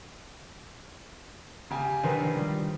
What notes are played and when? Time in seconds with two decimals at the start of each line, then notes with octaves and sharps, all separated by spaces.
1.71 C#3 G4 G#5
2.03 D#3 D4 B4 C5
2.36 G3 F4